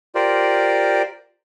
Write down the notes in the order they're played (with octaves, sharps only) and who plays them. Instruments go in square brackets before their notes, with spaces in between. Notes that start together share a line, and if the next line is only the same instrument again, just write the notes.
[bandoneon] F4 G4 A#4 C5 D5